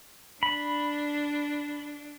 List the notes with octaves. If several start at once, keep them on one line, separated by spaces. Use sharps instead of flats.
D4 B5